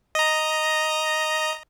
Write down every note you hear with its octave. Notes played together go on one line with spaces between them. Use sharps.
D#5 A#5